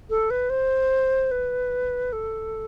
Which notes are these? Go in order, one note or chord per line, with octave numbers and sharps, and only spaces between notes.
A4
B4
C5
B4
A4